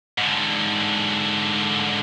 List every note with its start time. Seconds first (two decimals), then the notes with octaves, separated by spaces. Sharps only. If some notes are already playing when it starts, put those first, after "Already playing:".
0.18 G#2 D3